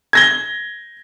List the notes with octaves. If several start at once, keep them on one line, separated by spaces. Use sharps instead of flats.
G#6 A#6 G7